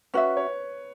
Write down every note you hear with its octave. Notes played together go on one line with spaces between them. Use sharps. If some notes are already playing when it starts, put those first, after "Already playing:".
C#4 F#4 B4 E5
C#5